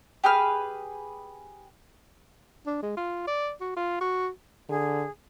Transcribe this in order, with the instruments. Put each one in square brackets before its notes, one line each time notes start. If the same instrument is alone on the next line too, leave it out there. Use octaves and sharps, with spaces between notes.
[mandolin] G4 G#4 B4 F6
[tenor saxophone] D4
G#3
F4
D5
F#4
F4
F#4
[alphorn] D3 [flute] G#4